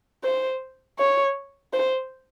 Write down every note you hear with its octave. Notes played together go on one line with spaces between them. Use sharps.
C5
C#5
C5